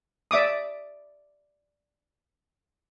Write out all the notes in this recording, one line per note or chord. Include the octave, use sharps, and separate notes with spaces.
D5 E5 D6 D#6